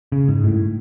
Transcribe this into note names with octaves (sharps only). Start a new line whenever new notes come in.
C#3
G#2
A2